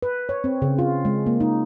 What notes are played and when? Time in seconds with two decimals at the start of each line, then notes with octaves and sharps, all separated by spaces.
0.02 B4
0.29 C#5
0.44 C4
0.62 C#3
0.79 F4
1.05 G#3
1.26 A#3
1.40 D#4